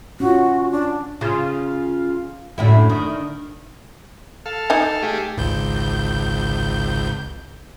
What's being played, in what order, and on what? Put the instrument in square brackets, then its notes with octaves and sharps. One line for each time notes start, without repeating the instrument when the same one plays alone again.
[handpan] C#4 F4 [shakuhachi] F#4
[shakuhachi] D4
[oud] C#3 [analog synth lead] F4
[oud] F#2 A2 E4 [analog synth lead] D3
[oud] D#3
[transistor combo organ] A4 F5
[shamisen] D#4 G#5
[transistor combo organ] A3 G4 G#4
[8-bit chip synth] G#1 C#2 G6